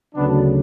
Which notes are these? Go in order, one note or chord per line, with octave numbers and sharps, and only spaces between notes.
D2 C#3 F#3 B3 D4